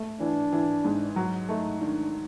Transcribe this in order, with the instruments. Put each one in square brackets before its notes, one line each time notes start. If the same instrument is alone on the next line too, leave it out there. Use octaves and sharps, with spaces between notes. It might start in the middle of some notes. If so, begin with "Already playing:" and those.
Already playing: [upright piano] A3
[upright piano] E3 [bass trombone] D4
[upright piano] E3
G#2
F#3
[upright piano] A3 [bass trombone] D#4
[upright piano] D#3 [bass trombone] D4